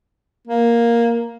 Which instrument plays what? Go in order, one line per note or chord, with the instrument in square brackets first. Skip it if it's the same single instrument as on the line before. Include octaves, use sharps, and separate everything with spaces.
[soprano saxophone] A#3